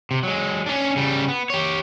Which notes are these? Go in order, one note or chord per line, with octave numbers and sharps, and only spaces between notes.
C3
F#3 G#3
C#4 D4
C#3 G3
B3
G4 C#5